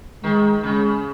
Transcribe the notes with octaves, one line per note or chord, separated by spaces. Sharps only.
D#3 G#3
C#3 G#3